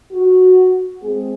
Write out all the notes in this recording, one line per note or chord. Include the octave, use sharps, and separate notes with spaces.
F#4
G#3 C4 G#4